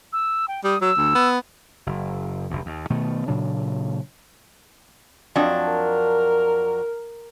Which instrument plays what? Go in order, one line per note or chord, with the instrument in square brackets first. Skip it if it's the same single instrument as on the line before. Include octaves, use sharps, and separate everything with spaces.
[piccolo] E6
G5
[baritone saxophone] G3 [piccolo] D#6
[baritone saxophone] F#3 [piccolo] E6
[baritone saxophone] D2
B3
[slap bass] F#1
F1 D2
D#2
B2 D#3 A3
A#2 C#3 F#3 D4
[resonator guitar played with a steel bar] F2 F#3 D4
[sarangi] A#4